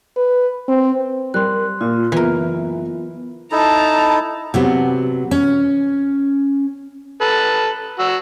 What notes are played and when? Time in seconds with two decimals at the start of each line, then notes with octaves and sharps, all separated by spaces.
0.17 B4
0.69 C4
1.34 G3 A#4 C6 F#6
1.81 A#2 F4
2.12 F#1 E3 B3 F4 A#4
3.52 D#4 E4 A4 A5 A#5
4.54 C3 F#3 B3
5.31 C#4
7.21 A4 B4
7.99 F#4 E6